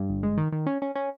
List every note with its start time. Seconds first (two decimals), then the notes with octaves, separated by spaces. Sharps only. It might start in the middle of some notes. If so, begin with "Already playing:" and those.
Already playing: G2
0.10 G1
0.23 G#3
0.37 D#3
0.52 D#3
0.66 C#4
0.82 C#4
0.95 C#4